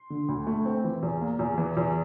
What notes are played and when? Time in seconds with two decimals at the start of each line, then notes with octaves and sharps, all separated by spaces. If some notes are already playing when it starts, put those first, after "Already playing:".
Already playing: C6
0.10 D3
0.28 D2
0.47 A3
0.65 C4
0.84 E3
1.03 E2
1.21 A#3
1.39 E2
1.58 E3
1.77 E2